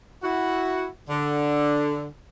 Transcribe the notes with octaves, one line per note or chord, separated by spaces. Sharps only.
E4 F#4
D3